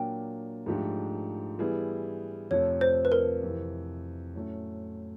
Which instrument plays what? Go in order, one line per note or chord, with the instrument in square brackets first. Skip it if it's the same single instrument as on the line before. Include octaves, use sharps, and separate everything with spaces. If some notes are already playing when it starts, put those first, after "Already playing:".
Already playing: [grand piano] A#2 F#3 A#3 D4 [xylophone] G5
[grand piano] G#2 F3 A3 D4 G4
E3 G3 B3 E4 G#4
[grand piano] F2 C3 F3 A3 [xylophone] C#5
[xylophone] C5
B4
A#4
[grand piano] F2 C3 E3
A2 F#3 A3 C#4